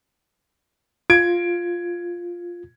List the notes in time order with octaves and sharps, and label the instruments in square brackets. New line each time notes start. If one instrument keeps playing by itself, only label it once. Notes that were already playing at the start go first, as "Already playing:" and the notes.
[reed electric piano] F4 [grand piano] G#6 D7